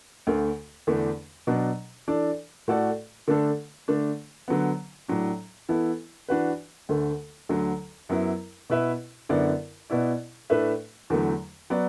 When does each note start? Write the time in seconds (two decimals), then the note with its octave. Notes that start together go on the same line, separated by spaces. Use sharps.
0.27 D2 D3 A3
0.87 E2 D3 A3 D4
1.47 B2 F#3 D4
2.08 E3 D4 A4 D5
2.68 A2 A3 F#4 A4 D5
3.28 D3 A3 D4 A4
3.88 D3 A3 D4
4.48 D3 F#3 B3
5.08 A2 F#3 D4
5.69 E3 B3 E4 A4
6.29 E3 D4 F#4 B4
6.89 D2 D3 A3
7.49 D2 D3 F#3
8.09 F#2 F#3 B3 E4
8.70 B2 B3 E4 B4 E5
9.29 F#2 D3 B3 E4 D5
9.90 B2 B3 E4 D5
10.50 A2 A3 D4 B4 E5
11.10 E2 D3 F#3 A3
11.70 F#3 B3 F#4 D5